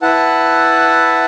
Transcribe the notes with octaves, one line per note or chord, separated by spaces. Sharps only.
E4 B4 F#5 A5